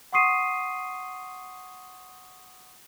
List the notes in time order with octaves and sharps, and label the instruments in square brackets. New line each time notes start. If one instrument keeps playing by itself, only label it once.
[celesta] F#5 C6 C#6 D#6 C7 D#7